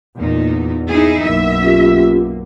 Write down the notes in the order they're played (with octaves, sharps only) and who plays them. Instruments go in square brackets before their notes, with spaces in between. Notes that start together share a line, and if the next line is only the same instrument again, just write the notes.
[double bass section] E2 [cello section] A#2 D#4
[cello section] D#4 E4 G#4
[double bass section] B1 F#2 A#3 [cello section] E5
[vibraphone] C#4 F4 G4